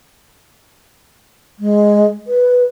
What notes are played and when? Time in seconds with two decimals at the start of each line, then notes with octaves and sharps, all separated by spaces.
1.59 G#3
2.27 B4